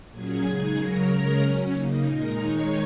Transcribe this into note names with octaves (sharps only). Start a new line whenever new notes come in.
A#2 F#3 C#4 G#4 G#5
C#3 G#3 D#4
C#3 F#3 C#4 A#4 A#5
C#3 G#3 C#4
F#3 C#4
C#3 A#3 D#4
A#2 G#3 D#4 A#4 A#5
D#3 G#3 D#4 C#5 C#6